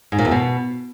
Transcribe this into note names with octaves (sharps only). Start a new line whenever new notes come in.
G#2
A#2
E2
B2